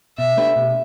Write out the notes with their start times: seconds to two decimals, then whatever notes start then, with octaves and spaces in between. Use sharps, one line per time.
0.18 B2 E5
0.37 A3 D4 G4 B4
0.56 B2